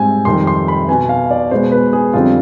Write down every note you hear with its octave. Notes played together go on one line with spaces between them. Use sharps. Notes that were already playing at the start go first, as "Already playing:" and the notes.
Already playing: G#2 G3 C4 G#5
F2 D#3 G3 C4 C6
C6
B5
B2 B3 G#5
F5
D5
B2 G#3 B3 C5
B4
G#4
F2 D3 G3 C4 F4